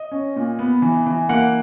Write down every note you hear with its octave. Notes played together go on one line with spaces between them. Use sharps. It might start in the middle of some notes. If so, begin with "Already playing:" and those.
Already playing: D#5
C#4
A#2
B3
E3
E3
A#3 F#5